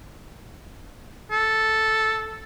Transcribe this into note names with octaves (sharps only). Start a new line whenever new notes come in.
A4